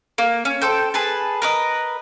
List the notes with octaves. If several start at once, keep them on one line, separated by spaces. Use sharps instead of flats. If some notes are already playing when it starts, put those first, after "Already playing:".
A#3
C#4
A4 C5 G5
G#4 B4 A5
A#4 B4 D#5